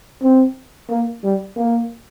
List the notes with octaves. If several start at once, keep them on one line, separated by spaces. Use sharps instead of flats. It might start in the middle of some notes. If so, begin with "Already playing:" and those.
C4
A#3
G3
A#3